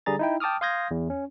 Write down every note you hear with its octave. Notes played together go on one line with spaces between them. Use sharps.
D3 G3 G#4 A#5 A6
D#4 E4 G5
G5 A5 D6 D#6 F6
F5 C6 D#6 G6 G#6 A#6
E2
C#4